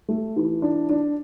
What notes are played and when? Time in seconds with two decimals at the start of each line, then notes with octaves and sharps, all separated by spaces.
0.09 A3
0.36 E3
0.62 D4
0.89 D4